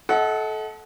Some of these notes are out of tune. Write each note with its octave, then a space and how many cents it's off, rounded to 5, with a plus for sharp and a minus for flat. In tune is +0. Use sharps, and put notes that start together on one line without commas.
A4 -20 D#5 +40 F#5 +0